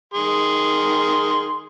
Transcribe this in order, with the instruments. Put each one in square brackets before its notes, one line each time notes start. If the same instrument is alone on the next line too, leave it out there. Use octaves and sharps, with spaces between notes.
[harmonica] D#3 G#4 C6